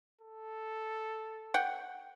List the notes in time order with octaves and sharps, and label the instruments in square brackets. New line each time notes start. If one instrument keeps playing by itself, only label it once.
[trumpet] A4
[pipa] F#5 G5